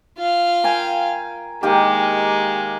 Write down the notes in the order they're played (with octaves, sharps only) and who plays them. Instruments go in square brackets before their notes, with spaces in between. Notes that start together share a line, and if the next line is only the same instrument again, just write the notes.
[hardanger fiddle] F4 F5
[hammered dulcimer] A#4 G5 G#5
[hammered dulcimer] D#3 A#3 G4 [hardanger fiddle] G#3